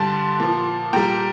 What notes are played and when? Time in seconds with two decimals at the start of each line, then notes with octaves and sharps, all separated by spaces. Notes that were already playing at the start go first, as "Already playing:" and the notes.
Already playing: G2 D3 G3 A5 C6
0.40 A#2 F3
0.93 A#2 G3 G5 A#5